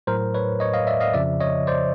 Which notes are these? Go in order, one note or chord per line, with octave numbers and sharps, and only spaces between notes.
A2 F#3 A#4 C5
B4 C#5
C#5 D#5
D#5 F5
D5 E5
D#5 F5
F2 C#3 F3 D5 E5
C#5 D#5
C5 D5